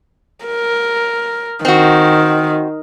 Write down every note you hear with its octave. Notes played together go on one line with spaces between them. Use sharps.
A#4
D#3 C4 F#4